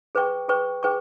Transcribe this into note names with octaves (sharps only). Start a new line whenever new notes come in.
G#4 B4 G5 C#6
G#4 B4 G5 C#6
G#4 B4 G5 C#6